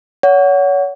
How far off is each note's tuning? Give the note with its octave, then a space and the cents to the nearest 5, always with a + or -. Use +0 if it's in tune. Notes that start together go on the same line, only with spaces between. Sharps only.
C#5 +30 F#5 +0